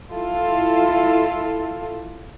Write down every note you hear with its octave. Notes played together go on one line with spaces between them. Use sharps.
E4 F4 A4